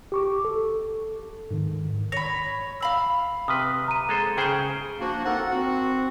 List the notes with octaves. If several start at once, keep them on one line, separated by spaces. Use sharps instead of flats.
G4 C#6 D6
A4
G#2 D#3
C#5 B5 A#6
F5 B5 E6
C3 B4 D#6 F6
A#5 D#7
G#3 A4 C5
C#3 G#4 C5 G5 C#6
F3 A#3 D4 F#4
C4 D#4 A4 A#4 F#5
C4 F#4